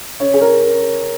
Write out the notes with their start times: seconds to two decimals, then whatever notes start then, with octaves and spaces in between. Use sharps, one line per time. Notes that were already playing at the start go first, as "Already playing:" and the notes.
0.19 C#3 C#5
0.34 G#4
0.41 A#4